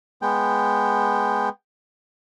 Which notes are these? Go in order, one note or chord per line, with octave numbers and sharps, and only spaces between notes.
G#3 B3 G5